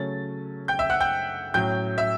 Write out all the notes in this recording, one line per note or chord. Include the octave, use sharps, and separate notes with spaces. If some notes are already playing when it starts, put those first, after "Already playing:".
Already playing: C#3 F#3 A3 C#4 A6
G5 G6
E5 E6
F#5 F#6
G5 G6
A2 F#3 C#4 G5 G6
E5 E6